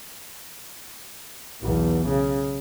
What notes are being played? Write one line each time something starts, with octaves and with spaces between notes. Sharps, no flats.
B1 E2
C#3